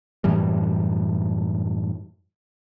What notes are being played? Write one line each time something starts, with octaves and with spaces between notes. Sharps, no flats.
F#2 A2 E3 G3